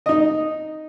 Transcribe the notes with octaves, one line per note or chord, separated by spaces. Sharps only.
D#4 D#5